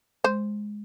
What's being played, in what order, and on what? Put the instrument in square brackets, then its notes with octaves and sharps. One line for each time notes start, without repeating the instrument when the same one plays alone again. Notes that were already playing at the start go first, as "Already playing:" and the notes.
[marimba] G#3 [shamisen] C5